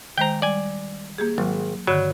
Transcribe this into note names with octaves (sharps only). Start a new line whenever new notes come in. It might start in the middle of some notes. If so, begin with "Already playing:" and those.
D#3 G#3 C5 G5 A#5
G3 D5 G#5
A#3 G4 G#4
G#1 F#3
G2 D3 D#3 F#3